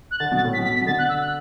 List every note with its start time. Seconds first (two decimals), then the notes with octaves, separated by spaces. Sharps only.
0.11 F#6
0.20 D3 A6
0.32 B2 A6
0.45 A2
0.53 B6
0.58 B2
0.64 B6
0.76 B6
0.82 B2
0.86 D3 A6
0.98 F#6
1.09 E6
1.21 F#6